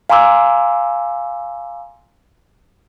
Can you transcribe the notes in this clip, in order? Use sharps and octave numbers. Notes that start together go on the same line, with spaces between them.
F5 G#5 A#5 C6 D6 E6